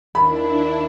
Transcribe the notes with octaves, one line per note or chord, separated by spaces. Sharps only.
D#2 D4 E4 B5